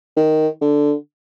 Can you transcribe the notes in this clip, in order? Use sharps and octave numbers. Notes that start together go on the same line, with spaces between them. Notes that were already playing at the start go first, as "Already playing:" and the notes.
D#3
D3